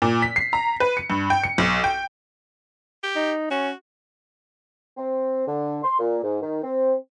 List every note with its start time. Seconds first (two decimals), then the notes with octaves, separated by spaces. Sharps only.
0.02 A#2
0.22 B6
0.36 C7
0.53 A#5
0.80 B4
0.97 C#7
1.10 G2
1.30 G5
1.43 C#7
1.58 B1
1.84 G5
3.03 G4
3.16 D#4
3.51 C#4 F#4
4.97 C4
5.47 D3
5.83 C6
6.00 A#2
6.23 G#2
6.42 D#3
6.63 C4